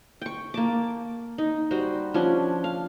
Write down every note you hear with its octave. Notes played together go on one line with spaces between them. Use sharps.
G5 C#6
A#3 A5 D6
D#4
G3 F#4 C5
F3 C#4 D4 C6
F5